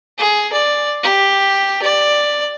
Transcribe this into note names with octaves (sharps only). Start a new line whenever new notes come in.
G#4
D5
G4
D5